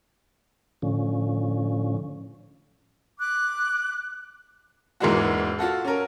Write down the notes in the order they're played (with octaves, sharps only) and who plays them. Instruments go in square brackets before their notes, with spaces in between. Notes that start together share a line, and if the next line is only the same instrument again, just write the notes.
[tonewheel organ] A2 D3 F3 C#4
[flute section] D6 F#6
[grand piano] E1 G#2 E3 G#3 A#3 F#4
F4 F#4 A4
C#4 A#4